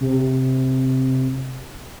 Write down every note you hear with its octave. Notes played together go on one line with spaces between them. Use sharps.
C3